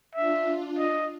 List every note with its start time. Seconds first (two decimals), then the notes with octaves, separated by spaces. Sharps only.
0.15 D4 F4 E5
0.78 D#5